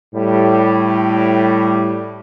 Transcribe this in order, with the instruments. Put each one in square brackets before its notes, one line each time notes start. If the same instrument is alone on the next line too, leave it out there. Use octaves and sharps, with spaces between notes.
[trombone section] A2 G3